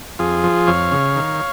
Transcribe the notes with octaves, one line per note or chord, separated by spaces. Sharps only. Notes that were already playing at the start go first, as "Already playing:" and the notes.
F2 F4 G#4
F3
F2 C#5 F5
C#3
D#3